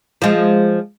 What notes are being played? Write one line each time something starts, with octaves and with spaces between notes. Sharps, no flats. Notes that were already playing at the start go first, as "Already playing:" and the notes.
F3 G#3